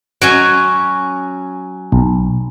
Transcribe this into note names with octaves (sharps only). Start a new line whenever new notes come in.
F#3 C#4 G#5
B1